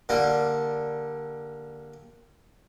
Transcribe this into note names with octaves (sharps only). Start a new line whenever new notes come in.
D3 G3 A#3